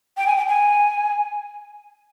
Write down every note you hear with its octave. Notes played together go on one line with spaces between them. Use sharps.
G5
G#5
G5
G#5